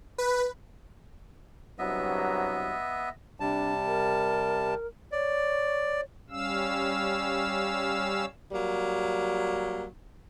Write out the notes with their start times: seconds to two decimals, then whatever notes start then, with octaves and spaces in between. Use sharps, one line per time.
0.18 B4
1.79 C2 G2 F#3 B3 D#5 E5
3.40 C3 G3 D4 A5
3.87 A#4
5.12 C#5 D5
6.30 G3 C#4 F5 E6
8.52 F#3 G3 A#3